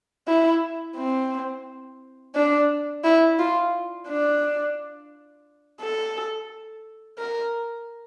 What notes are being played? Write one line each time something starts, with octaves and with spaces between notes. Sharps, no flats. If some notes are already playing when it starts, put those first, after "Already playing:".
E4
C4
D4
E4
F4
D4
A4
A#4